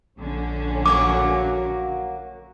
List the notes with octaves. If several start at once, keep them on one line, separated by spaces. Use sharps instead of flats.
A#1 D3 C#4
F#3 A#3 F#4 D6